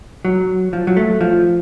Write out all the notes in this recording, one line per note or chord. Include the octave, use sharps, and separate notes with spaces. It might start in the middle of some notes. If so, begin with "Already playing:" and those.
F#3
F3
F#3
A3
F3